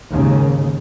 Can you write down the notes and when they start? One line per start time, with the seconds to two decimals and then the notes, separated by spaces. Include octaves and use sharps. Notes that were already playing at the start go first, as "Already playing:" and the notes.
0.12 D#2 G#2 C#3